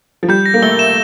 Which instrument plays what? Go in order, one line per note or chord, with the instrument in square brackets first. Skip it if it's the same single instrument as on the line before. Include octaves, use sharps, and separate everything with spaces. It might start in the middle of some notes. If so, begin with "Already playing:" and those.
[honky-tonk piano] F3
[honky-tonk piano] G3 [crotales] G6
[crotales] A#6
[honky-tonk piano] A#3
[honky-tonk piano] A3 [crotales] G7
[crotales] E7